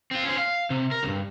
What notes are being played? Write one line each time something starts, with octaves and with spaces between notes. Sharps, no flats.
C4 F4
C#4 C5
F5
C3
A#4
C2 G2